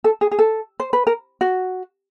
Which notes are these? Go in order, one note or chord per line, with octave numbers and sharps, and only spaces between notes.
A4
G#4
G#4
A4
C5
B4
A#4
F#4